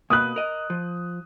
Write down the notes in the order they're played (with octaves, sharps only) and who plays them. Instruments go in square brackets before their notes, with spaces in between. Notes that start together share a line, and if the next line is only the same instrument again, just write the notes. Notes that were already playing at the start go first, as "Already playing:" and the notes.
[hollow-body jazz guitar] B2 A#3 B4 [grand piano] D#6 F#6
[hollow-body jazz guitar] A#4 D#5
F3